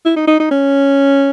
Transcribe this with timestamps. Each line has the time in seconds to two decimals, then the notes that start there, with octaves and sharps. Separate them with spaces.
0.05 E4
0.16 D#4
0.27 D#4
0.40 D#4
0.51 C#4